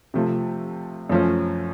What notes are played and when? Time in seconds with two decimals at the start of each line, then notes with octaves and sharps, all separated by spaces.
0.14 C3 F3 A3
1.10 F#2 F3 A3 C#4